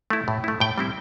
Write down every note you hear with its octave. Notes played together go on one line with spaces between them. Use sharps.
A3 E4
A2
A3 E4
A2 G5
G3 C4 E4